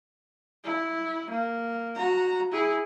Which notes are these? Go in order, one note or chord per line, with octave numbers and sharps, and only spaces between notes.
E4
A#3
F#4 A#5
E4 G#4